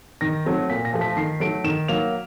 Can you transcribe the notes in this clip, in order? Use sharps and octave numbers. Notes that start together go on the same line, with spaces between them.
D#3 A#6
F#3 A3 C4
A#2 B6
A#6
F3 A3
B6
D#3 C7
F#3 A3 D7
D#3 E7
F#3 A#3 F7